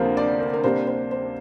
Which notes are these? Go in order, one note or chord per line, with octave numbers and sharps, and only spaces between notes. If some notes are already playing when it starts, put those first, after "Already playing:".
Already playing: D2 C3 F3 A#3 A#4 C5
D5
A#4
A#4
C3 G3 A#3 D4 C5
C5
C5